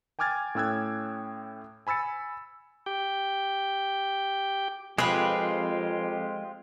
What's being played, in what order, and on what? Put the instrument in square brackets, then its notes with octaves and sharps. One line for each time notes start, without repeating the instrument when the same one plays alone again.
[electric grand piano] G5 G#5 D6 F6 G#6 A6
A2 C#4 G5 E6 F#6 G#6
G#5 B5 E6 A6 C#7
[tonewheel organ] G4 G5
[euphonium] F2 [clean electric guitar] G#3 C4 [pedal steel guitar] F4 G4 [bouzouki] G#4 B4